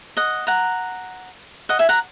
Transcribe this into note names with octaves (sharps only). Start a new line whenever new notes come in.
D#5 F#5
F#5 A#5
D#5 F#5
E5 G#5
F#5 A#5